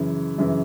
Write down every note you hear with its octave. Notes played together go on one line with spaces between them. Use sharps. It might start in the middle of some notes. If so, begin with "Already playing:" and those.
Already playing: F#2 C#3 E3
F#2 C#3 E3